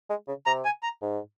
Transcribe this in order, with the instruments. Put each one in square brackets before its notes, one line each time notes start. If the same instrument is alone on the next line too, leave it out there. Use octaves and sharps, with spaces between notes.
[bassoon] G#3
C#3
[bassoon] C3 [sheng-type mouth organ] A#5
[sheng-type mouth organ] G#5
A#5
[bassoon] G#2